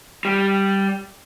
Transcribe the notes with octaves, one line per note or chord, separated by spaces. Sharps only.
G3